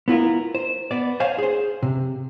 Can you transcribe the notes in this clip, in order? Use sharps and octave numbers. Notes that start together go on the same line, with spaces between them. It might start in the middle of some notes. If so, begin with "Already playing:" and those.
B3 E4 F4 A#4
C5
B3 D5
C5 C#5 F5 F#5 G#5
G#4 C5
C3